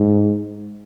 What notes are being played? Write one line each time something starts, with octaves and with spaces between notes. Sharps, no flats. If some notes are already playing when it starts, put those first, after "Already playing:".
Already playing: G#2